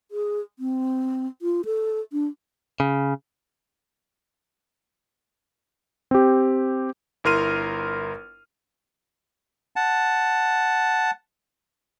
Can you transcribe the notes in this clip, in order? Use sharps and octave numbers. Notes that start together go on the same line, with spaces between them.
G#4
C4
F4
A4
D4
C#3
C4 G4
G1 E4 A#4 C6 F6 D#7
F#5 A5